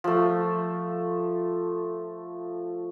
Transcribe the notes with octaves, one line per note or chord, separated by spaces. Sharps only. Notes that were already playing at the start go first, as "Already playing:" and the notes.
F3 A3